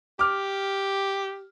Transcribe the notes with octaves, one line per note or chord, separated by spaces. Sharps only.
G4 D6 F6